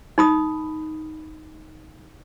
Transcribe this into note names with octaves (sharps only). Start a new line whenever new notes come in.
D#4 B5 D#6